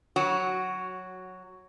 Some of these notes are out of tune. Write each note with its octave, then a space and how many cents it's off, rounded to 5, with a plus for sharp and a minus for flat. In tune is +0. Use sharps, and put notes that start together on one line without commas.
F#3 -5 F#4 +10 C#5 +0